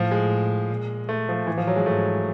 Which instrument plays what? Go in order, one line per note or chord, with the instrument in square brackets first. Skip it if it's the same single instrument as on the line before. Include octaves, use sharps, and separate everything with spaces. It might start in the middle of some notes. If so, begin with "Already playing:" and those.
Already playing: [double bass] A2 [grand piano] F3
[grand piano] G#3
[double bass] A#2
[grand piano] A3
F3
[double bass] A2 [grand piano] E3
[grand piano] F3
F#3
G#3
[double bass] G#2 [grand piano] A3